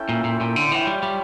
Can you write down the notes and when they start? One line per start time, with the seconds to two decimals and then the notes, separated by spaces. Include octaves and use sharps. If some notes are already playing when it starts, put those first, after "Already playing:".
Already playing: C#4 E4 A4 E5 G5
0.09 A#2
0.24 A#2
0.41 A#2
0.56 D3
0.71 E3 F4 C#5 E5 G5
0.87 G3
1.03 G3